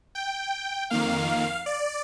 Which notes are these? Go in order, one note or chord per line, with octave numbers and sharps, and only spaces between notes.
G5
F2 D#3 A#3 F5
D5